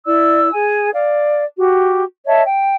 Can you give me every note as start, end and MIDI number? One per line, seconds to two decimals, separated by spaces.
0.06 0.51 64
0.06 0.51 74
0.06 0.51 88
0.54 0.90 68
0.54 0.90 80
0.94 1.43 74
0.94 1.43 77
1.58 2.03 66
1.58 2.03 67
2.27 2.42 73
2.27 2.42 75
2.27 2.42 76
2.27 2.42 81
2.44 2.75 79